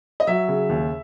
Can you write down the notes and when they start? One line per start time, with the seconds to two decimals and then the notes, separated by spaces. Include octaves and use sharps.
0.20 D#5
0.27 F#3 E5
0.48 C#3
0.69 D#2